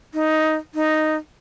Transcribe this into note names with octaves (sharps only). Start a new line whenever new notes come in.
D#4
D#4